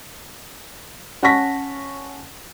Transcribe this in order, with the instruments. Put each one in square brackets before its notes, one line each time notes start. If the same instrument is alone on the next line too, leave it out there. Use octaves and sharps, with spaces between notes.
[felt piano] C#4 F#5 A5 C#6 A#6 B6